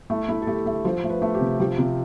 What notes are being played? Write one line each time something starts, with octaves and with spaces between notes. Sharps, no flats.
A3 E4
A3 E4
A4
A3 G4
A3 A4
F3 C5
A3
B4
A3
G4
C3
F3 G4
C3 F4